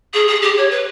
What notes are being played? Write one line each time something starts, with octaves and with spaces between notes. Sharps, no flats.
G#4
G#4
G4
C#5
B4